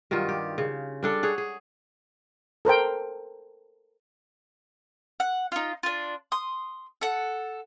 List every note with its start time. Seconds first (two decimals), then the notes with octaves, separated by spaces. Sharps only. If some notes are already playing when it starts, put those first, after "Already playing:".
0.11 G2 D#3 F#3 F4
0.29 G4
0.58 C#3
1.03 G3 D4 A4
1.23 G#4 C#5 F#5
1.38 G#4
2.65 A4 A#4 C5 G5
5.20 F#5
5.52 D#4 F4
5.83 D4 F4
6.32 C6 D#6
7.01 A4 F#5